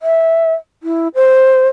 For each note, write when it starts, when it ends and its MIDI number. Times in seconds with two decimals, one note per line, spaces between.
0.03 0.54 76
0.83 1.08 64
1.15 1.68 72